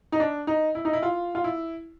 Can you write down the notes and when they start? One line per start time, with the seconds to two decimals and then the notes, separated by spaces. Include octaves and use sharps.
0.12 D#4
0.20 D4
0.47 D#4
0.75 E4
0.85 D#4
0.93 E4
1.03 F4
1.35 F4
1.44 E4